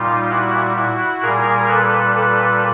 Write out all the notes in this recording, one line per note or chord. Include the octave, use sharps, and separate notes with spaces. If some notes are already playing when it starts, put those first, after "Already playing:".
Already playing: A#2 G3 D#4 F4
E4 F#4
E4 F#4
A#2 G3 G#4 A#4
A4 B4
A4 B4